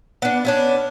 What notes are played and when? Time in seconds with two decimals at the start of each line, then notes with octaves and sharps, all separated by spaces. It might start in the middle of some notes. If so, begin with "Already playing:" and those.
0.22 B3 D4
0.45 B3 C#4 D4